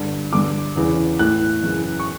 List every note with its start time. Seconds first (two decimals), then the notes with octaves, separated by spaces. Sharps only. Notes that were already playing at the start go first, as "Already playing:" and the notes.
Already playing: G2 D3
0.33 G2 D3 D6
0.76 E2 C#3 E3
1.19 A2 E3 F#6
1.63 F#2 C#3 E3
2.00 C#6